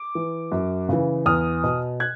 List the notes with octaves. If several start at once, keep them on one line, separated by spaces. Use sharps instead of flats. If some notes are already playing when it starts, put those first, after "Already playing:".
Already playing: D6
E3
F#2
C#3 E3
E2 D#6 F6
B2
F#6 G#6